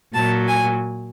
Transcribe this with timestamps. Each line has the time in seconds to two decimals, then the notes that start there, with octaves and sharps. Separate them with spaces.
0.14 A#2 F#3 A5
0.48 G#5